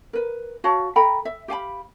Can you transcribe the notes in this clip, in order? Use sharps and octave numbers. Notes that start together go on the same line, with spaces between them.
A#4 B4
F#4 C#5 F5 A5
A4 G5 A#5 B5
E5
G4 F5 G#5 B5